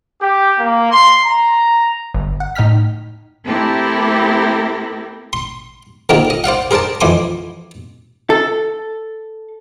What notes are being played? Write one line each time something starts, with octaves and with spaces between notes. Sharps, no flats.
G4
A#3
C6
A#5
G1
F#5
A2 D#4 G5 F6 B6
A3 C4 E4 G4 A4 A#4
C6
D3 A#3 C4 D#4 F4 G#4
D#5
C5 D5 F5 F#5
G#4 A#4 C5 D5 A5
F2 E3 G#5 C6 D6
A4